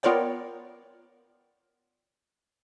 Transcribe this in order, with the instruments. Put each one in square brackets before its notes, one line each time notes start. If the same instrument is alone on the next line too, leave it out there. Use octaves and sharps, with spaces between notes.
[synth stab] B3 F4 A#4 C#5 D5 G5